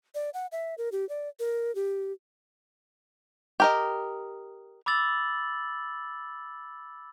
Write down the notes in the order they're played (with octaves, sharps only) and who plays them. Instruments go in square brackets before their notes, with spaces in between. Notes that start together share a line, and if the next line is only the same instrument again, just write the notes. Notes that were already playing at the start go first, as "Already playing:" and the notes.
[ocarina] D5
F#5
E5
A#4
G4
D5
A#4
G4
[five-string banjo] G4 A#4 D#5
[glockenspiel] B5 D6 E6 A6 F#7